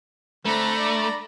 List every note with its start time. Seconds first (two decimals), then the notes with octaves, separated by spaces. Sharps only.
0.45 D3 A3 C4 D4 A#5 B5
0.76 D4 D5